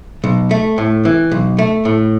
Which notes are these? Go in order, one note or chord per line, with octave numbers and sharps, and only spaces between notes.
B1
A3
A2
E3
B1
A3
A2